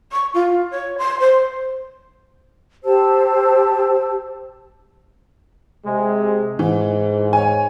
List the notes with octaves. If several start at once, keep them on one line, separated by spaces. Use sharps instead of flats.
C#6
F4
C#5
C6
C5
G4 C5 A5 E6
C3 G#3
G#2 E3
C#5 G#5